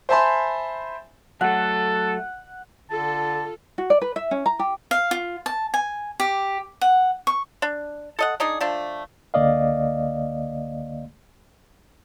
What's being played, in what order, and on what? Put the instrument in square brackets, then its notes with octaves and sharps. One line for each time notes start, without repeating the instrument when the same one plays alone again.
[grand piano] C5 E5 G#5 A5 B5 C6
[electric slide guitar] F#3 A3 [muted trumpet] A4 [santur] F#5
[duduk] D3 [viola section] F4 A4 [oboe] A5
[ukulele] F#4
D5
B4
E5
C#4
A#5
G4
[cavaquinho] F5
F4
A5
G#5
G4
F#5
C#6
[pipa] D4
A4 D#5 F#5
D4 D#4 G#4
F3 A3 D4
[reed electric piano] C#2 D3 A#3 D5 D#5 F5